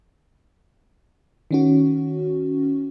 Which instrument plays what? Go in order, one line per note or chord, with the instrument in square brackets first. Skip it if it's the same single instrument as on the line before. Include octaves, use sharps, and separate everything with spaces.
[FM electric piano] D#3 C#4 F#4